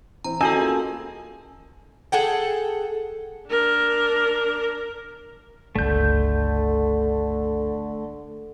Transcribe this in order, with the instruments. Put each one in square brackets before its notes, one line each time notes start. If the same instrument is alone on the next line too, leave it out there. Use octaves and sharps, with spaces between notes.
[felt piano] E3 C4 [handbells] A#5
[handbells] C#4 F#4 A4 [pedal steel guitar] D#5 A5 E6 [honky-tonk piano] G#5
[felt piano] A#3 F4 G#4
[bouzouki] G#4 A4 F#5 G5
[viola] D4 A#4
[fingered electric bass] G1 C#2 [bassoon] D3 [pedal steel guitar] A3 G6